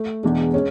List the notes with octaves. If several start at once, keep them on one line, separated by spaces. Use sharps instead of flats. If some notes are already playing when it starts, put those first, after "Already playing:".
Already playing: A3
E2 B2 G#3 D4
G#3 C#4